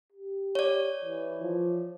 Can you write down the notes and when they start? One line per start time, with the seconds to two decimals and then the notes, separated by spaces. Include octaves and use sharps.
0.12 G4
0.55 C#5 D5
1.04 E3
1.42 F3